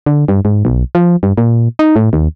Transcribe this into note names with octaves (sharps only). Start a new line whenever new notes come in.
D3
G2
G#2
B1
F3
G2
A#2
D#4
A2
D#2